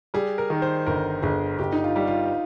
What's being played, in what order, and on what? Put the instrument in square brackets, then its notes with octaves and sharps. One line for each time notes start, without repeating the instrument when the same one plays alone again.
[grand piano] G3 [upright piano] G#4
[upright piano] A#4
[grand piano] D#3
[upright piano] C5
[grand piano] G1 [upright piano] A#4
[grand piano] G1 [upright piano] G#4
[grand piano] G1 [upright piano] G4
[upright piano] D#4
F4
[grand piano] G3
[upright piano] F4